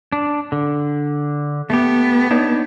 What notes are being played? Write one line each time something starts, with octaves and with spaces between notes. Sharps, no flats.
D4
D3
A3 B3 G4
D4 D#4 C#5